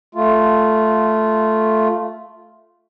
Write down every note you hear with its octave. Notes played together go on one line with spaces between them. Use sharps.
A3 F4